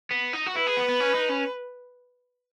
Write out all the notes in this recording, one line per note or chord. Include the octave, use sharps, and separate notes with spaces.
B3
D#4
F#4
E4 B4
G#4
B3
B3
C#4
D#4
C#4